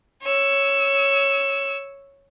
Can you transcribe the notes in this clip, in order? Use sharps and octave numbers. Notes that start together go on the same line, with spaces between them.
C#5 E6